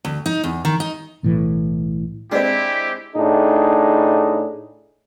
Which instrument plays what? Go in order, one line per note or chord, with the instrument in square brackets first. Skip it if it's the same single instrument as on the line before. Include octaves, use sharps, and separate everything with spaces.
[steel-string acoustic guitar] D2
D#4
E2
D#3
D#4
[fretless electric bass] B1 A2 E3
[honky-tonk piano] G#3 C4 [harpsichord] D4 [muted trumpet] E4 [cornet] G4
[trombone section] A2 D4 D#4 G#4